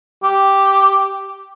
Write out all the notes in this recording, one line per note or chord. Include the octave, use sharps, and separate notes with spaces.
G4